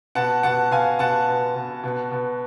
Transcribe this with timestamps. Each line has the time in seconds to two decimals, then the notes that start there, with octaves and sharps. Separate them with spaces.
0.15 B2 F#5 A5
0.43 B2 F#5 A5
0.71 B2 F5 G#5
0.99 B2 F#5 A5
1.28 B2
1.56 B2
1.84 B2
2.11 B2